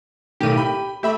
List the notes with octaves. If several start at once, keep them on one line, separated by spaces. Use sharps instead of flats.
B1 A2 D#3 G4 D#7
G5 B5
A3 G4 E5 B5